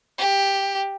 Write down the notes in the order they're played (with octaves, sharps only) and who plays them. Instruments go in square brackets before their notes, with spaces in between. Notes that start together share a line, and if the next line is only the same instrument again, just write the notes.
[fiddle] G4